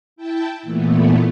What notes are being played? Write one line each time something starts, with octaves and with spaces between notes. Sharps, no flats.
E4 G5 A5
A#2 E3 A3 B3